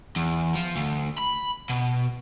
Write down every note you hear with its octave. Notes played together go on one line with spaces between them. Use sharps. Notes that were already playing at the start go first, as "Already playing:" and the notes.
E2
F3
D2
B5
B2